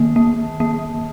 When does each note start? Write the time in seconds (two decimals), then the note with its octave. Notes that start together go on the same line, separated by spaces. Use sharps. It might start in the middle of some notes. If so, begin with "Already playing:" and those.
Already playing: D#3 A#3
0.16 A#3
0.60 A#3